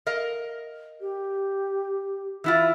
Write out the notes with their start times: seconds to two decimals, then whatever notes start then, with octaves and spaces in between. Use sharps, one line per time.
0.07 A#4 D#5 F5
1.01 G4
2.44 E3 E4 F4